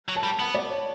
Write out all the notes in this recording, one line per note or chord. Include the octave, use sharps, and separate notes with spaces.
F#3
A5
G3
B3 F#5
D5
C#5